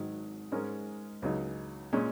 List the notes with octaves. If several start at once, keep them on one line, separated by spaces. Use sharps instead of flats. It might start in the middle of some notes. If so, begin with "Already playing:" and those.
Already playing: G#1 G#2 D#3 F#3
G#2 G#3 C#4 A#4
C#2 C#3 F#3 D#4
A#2 G#3 C#4